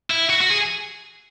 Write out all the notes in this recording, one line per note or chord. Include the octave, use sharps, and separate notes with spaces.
E4
F#4
F#4
G#4